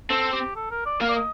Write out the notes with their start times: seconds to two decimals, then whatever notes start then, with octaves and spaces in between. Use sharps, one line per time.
0.10 C4 A4
0.33 G4
0.56 A4
0.71 A#4
0.86 D5
1.01 A#3 F5
1.09 D5
1.16 D#5